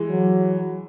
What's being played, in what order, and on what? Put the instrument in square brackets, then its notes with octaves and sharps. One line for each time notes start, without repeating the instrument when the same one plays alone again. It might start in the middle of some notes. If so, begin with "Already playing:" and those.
Already playing: [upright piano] E3 G#3
[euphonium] F#3